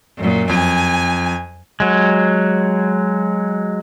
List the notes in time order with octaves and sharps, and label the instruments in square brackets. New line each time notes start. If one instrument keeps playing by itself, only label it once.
[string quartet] F#2 A#2
[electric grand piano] F2 [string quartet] G#5
[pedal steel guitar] F#3 G#3